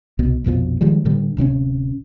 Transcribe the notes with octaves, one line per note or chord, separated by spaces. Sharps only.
C2 B2
A#1 F2 B2 F3
D#3 F3 G3 G#3
A2 D3 G3
D1 C3 C4 C#4